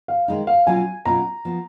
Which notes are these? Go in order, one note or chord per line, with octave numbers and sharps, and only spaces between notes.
F5
D#3 G#3 D#4
F5
B2 F#3 C#4 F4 G#5
B2 F#3 C#4 F4 A#5
F3 B3